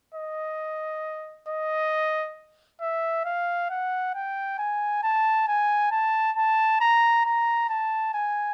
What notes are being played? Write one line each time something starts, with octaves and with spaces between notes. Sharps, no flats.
D#5
D#5
E5
F5
F#5
G5
G#5
A5
G#5
A5
A5
A#5
A#5
A5
G#5